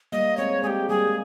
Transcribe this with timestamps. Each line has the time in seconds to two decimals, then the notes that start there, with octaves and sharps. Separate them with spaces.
0.12 G3 A#3 D#5
0.37 G#3 C4 C#5
0.63 G#3 C4 G4 G#4
0.89 G3 A#3 G#4
1.08 G#3